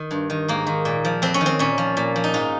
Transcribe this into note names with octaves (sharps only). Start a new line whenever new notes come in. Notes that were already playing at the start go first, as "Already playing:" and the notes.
Already playing: D#3
G2
D#3
G#2 A#3
D#3
A#2
F3
F2 C4
C#4
D#3
C4
A#2 C#4
F3
A#2
F3
D#4
G#2 F4